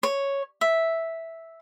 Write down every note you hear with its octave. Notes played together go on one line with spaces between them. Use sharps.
C#5
E5